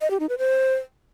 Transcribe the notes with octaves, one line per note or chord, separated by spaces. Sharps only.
D#5
G4
D#4
B4
C5